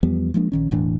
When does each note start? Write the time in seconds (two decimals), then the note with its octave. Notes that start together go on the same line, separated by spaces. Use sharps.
0.03 E2 F3 G3 B3
0.34 F3 G#3 A#3 D4
0.52 A#1 D#3 C#4
0.71 E1 A2 E3 D4